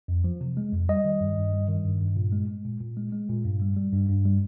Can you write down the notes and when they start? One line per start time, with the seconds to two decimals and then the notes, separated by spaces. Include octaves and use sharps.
0.08 F2
0.24 F3
0.41 C3
0.57 G#3
0.73 F2
0.89 G3 D#5
1.05 D#3
1.21 G2
1.37 G2
1.53 G3
1.68 D#3
1.85 G2
2.01 G2
2.16 A#2
2.32 G#3
2.48 G#3
2.65 A#2
2.81 A#2
2.97 G#3
3.12 G#3
3.29 A#2
3.45 G2
3.61 G3
3.77 G3
3.92 G2
4.09 G2
4.25 G3